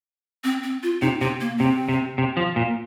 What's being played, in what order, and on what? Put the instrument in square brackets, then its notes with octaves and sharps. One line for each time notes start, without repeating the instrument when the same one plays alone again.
[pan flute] C4
C4
F4
[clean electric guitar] C3 [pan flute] D#4
[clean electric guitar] C3 [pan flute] C4
[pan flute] A#3
[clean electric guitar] C3 [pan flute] C4
[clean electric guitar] C3
C3
F3
A#2